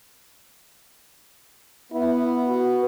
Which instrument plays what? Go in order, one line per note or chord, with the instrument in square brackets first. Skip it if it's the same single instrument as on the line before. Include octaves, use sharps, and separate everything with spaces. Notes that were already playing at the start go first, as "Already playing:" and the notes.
[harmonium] B3 [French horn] E4
[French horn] F#4